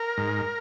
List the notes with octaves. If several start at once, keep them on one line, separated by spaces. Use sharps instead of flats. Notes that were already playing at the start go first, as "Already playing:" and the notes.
Already playing: A#4
G#2